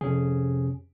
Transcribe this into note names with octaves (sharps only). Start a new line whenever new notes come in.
F2 C3 C#4 G#4